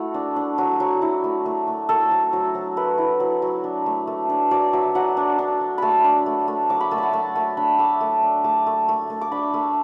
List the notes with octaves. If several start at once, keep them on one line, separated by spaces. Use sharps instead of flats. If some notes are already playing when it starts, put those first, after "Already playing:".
Already playing: A3 E4 F#4 A4
D4
D4
F#3 F#4
F#3
E4
A3
A3
A3
A3 A4
F#3
F#3
F#3
A3 B4
E4
F#3
F#3
D4
A3
A3
D4
F#3 D5
F#3 E5
F#3 F#5
D4
D4
F#3
A3 A5 B5
D4
A3
A3
F#3 D6
B5
A3 A5
E5 F#5
A3 A5
A3
D4 B5
A3 D6
A3
D4
A3 D6
A3
A3
A3
D6
D4 B5
A3